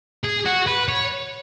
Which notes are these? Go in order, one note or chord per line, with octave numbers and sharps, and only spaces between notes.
G#4
F#4
B4
C#5